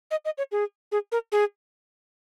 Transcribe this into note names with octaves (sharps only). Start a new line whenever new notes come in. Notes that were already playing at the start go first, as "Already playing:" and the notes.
D#5
D#5
C#5
G#4
G#4
A#4
G#4